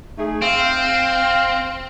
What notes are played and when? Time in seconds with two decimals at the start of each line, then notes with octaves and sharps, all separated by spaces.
0.18 A3 D#4 G#4
0.42 C4 F5